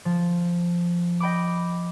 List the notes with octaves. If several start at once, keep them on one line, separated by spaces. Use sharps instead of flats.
F3
D#5 G5 B5 D6